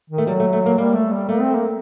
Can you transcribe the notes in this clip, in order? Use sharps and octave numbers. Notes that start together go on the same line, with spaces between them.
D#3
A3
F#3 G3
A3
A3
A#3
G3 A#3
A3
G3
A3 A#3
C4
A#3